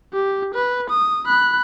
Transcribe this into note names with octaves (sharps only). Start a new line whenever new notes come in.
G4
B4
D#6
B5 F#6